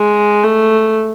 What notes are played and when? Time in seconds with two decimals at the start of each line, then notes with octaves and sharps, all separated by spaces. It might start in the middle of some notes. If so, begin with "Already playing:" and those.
Already playing: G#3
0.43 A3